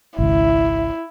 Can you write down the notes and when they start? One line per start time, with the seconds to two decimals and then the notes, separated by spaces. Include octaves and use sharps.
0.18 G#1 C#2 E4